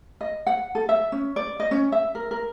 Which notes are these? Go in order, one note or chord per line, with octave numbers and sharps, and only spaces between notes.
D#5
F#5
A4
E5
C#4
D5
D#5
C#4
E5
A#4
A#4